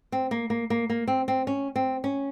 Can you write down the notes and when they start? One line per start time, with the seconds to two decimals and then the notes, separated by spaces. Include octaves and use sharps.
0.12 C4
0.31 A#3
0.50 A#3
0.70 A#3
0.90 A#3
1.08 C4
1.28 C4
1.47 C#4
1.76 C4
2.04 C#4